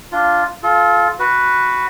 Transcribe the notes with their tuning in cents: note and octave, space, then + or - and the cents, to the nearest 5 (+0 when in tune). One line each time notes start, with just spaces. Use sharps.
D4 +0 F4 +0
F4 +0 A4 -35
F#4 +0 B4 +0